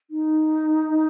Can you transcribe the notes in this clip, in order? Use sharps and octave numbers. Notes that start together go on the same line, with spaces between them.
D#4